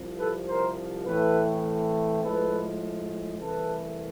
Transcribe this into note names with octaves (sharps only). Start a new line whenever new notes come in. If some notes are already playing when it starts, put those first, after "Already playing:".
Already playing: C2 C3 F3
A4 B4
A#4 C5
A2 E3 A3 C4 A4 B4
A2 F3 G#3 A4 B4
C2 C3 E3 A3 C4 A4 B4